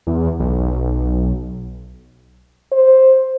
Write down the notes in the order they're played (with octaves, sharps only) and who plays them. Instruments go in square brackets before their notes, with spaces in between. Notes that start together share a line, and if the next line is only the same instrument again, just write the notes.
[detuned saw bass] E2
B1
[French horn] C5